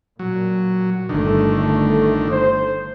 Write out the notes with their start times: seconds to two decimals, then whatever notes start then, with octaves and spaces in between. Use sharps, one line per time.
0.19 A#2 F#3
1.09 G1 D3 D#3 G3 A3
2.32 C5